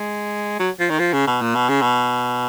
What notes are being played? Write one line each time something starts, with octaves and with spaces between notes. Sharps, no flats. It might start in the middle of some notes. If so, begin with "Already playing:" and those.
Already playing: G#3
F#3
F3
D#3
F3
C#3
B2
A#2
B2
C#3
B2